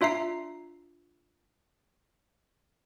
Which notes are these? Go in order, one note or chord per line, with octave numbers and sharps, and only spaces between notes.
D4 F4 E5 A#5 C7